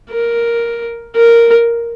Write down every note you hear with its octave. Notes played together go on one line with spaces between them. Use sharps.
A#4
A#4